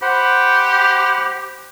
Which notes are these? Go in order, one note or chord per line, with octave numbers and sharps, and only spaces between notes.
G4 C5 F#5 B5